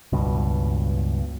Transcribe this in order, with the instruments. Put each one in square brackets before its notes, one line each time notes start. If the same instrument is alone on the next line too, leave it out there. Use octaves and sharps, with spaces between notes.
[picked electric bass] C#2 G2 B2